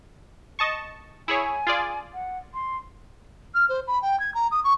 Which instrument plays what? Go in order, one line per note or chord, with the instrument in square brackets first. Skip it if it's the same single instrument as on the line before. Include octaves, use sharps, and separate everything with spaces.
[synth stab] D#5 A5 C#6
[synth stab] E4 G#4 C#5 [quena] G#5
[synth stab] F4 G#4 D5
[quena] F#5
C6
[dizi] F6
C5
B5
G5
G#6
A#5
D#6
C#6